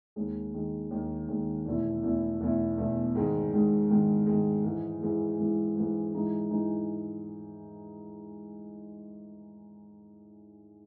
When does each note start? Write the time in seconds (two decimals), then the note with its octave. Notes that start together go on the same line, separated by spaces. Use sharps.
0.16 D#2 D#3 G#3
0.53 D#2 D#3 G#3
0.91 D#2 D#3 G#3
1.28 D#2 D#3 G#3
1.65 E2 B2 A3 E4
2.03 E2 B2 A3 E4
2.41 E2 B2 A3 E4
2.78 E2 B2 A3 E4
3.15 G#2 D#3 G#3
3.52 G#2 D#3 G#3
3.90 G#2 D#3 G#3
4.26 G#2 D#3 G#3
4.64 G#2 E3 G#3
5.01 G#2 E3 G#3
5.38 G#2 E3 G#3
5.76 G#2 E3 G#3
6.14 G#2 E3 G#3 D#4
6.51 G#2 E3 G#3 D#4